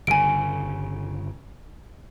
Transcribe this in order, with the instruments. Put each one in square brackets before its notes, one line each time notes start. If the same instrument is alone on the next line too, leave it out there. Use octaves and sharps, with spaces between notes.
[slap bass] G1 C#3 [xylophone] G#5 D7